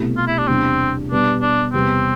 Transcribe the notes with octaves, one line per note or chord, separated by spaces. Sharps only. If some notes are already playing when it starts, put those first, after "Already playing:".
Already playing: C2 B2 A3 E4
F4
E4
D4
E2 C3 G3 C4 D4
B2 G3 B3 D4
D4
E2 C3 G3 B3 C4